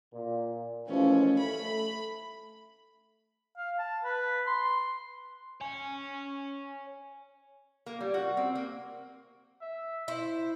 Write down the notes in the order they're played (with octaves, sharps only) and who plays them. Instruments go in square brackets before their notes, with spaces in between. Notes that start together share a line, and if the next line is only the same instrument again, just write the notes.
[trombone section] A#2
[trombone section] D#2 E3 F3 [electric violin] A3 C#4
[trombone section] A3 [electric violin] B5
[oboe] F5
A5
B4
C6
[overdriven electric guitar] C#5 G#5
[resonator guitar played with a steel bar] A#3
G3
F#4
C4
A#3
[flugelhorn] E5
[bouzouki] E4 [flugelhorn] C5